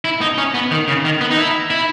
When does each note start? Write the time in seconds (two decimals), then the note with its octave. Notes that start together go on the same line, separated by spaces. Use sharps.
0.05 E4
0.21 D#4
0.38 C#4
0.54 B3
0.71 D#3
0.88 C#3
1.05 D#3
1.21 B3
1.31 D#4
1.38 E4
1.70 E4